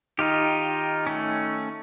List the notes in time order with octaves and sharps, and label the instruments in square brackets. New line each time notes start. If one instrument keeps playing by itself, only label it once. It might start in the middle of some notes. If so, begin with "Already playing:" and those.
[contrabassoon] D#3 [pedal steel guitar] D#4 F4 G4
[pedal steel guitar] A3 C#4